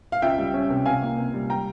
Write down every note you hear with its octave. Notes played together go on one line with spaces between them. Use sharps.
F5
C#2 E5 G5
G3
C#4
C3
C3 F5 G#5
A#3
C3
G3
G5 A#5